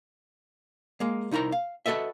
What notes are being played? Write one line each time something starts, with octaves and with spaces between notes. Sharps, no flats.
G#3 A#3
C2 D#4 E4 A#4 A#5
F5
F#4 A4 B4 D#5 E5